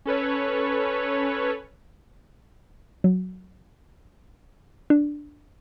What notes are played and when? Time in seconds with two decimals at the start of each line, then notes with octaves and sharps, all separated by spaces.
0.05 C#4 A4 B4 C#5
3.04 F#3
4.90 D4